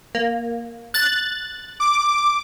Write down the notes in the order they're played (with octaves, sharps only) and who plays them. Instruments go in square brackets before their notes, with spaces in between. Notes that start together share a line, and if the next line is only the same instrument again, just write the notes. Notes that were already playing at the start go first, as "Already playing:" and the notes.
[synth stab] A#3
F#6 A6
[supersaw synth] D6